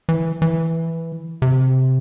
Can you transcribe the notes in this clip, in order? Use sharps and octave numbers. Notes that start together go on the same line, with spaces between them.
E3
E3
C3